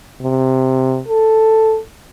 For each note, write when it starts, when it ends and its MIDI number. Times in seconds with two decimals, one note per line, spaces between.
0.21 1.01 48
1.08 1.79 69